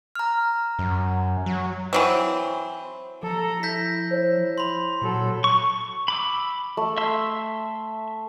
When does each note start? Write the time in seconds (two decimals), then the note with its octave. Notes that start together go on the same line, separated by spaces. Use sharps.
0.15 A#5 F6
0.79 F#2
1.46 F#3
1.93 E3 F#3 C4
3.23 F3 A4 A#5
3.63 E4 E5 G6 A#6 B6
4.11 C5 C#5
4.58 B5 C6
5.02 A#2 F#3 A4
5.44 C#6
6.08 B5 D6 E6
6.77 A3
6.98 E5 C6 E6